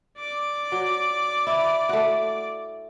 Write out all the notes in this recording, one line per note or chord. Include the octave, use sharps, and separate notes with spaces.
D5 D6
F#3
E4
A3 F#4